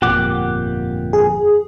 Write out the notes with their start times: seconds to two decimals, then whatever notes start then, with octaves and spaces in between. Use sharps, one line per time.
0.02 G1 F2 A#2 G4 F#5 D6
1.13 G#4